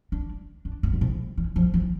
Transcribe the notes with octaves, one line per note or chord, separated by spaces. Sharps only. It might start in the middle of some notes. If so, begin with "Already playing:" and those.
D4
D4
B3
D3
C3
E3
F3
E3